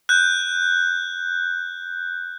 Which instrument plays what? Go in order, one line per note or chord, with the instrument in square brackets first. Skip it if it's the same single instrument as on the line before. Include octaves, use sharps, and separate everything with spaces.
[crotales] F#6 G6